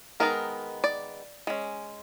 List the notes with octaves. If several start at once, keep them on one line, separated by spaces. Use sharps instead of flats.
D#3 G#3 B3 D#4 A#4
D5
G#3 C#4